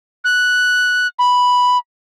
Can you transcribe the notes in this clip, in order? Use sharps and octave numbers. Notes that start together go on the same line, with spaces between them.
F#6
B5